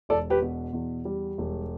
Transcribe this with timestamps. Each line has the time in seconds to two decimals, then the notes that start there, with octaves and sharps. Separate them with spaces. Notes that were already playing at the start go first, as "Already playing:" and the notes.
0.09 E1 A4 D5
0.30 G4 B4
0.42 B2
0.73 E2
1.05 G3
1.38 E1